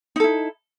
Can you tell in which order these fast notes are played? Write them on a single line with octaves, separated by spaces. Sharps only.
D#4 A4 E4